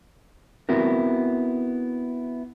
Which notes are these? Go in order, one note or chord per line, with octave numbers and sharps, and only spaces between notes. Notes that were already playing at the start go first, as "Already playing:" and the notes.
B3 C4 E4 F#4 A#4